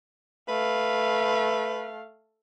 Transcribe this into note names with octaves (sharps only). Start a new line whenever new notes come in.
A3 B4 F5